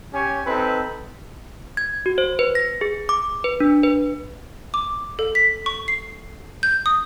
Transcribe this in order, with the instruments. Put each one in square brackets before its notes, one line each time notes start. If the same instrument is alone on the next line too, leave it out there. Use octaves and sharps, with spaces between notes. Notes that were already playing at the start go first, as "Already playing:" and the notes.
[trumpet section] C#4 G4 C#5 G#5
C4 D#4 A4 B4
[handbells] G#6
F#4
C5
B4
A#6
G#4
D6
B4
D4
B4
[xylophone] D6
A4
B6
C#6
C7
G6
D#6